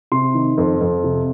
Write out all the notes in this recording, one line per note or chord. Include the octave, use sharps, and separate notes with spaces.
C3 C6
D#3
F2
F2
C3